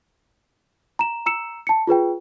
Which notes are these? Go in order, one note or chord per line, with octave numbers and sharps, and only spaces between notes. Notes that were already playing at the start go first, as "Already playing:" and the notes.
A#5 E7
A#5 E6 C#7 E7
A5 C#7
F4 G#4 B4 G5